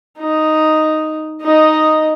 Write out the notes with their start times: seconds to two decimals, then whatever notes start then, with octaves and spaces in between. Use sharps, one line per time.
0.18 D#4
1.41 D#4 D#5